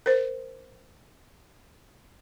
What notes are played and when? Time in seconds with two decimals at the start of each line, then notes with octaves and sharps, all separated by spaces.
0.06 A#4 C5